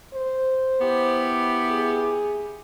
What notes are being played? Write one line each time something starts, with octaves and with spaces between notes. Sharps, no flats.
C5
B3 E4 G4
G#4